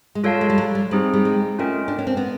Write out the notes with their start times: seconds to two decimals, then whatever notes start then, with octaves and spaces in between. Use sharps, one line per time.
0.15 G#3
0.24 G3 F4 A4 C#5 F5 A5
0.41 G#3
0.50 G3
0.58 F#3
0.75 G3
0.91 G3 C4 D#4 G#4 C5
1.14 G3
1.25 G#3
1.58 A3 C#4 F4 A#4 D#5 G5
1.88 D4
1.99 C#4
2.07 C4
2.17 B3